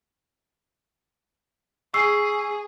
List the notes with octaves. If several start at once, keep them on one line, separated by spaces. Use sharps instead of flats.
G#4 C#6 E6 C7